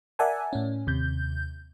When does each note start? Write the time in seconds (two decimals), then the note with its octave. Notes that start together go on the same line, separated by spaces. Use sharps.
0.19 A#4 D5 E5 F#5 G#5 A5
0.53 A2 C#4
0.87 D#2 C3 G6